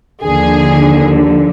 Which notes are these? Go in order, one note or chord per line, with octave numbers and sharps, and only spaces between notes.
D#2 D3 F3 G#4